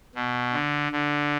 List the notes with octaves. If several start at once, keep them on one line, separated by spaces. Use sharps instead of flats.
B2
D3
D3